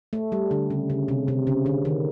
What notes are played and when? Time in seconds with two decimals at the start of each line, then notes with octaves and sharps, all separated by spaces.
0.13 A3
0.32 G3
0.51 D3
0.70 C#3
0.90 C#3
1.08 C3
1.28 C3
1.47 C#3
1.66 D3
1.85 D#3